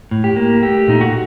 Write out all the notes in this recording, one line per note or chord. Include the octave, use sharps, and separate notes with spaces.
A2
G4
A#3
A3 G4
A#2 D#4
F#4